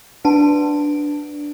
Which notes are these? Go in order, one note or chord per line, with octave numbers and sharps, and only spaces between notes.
D4 F#4 B4 F#5 A5